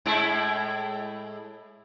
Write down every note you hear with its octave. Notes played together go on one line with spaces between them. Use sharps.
A2 G#3 E4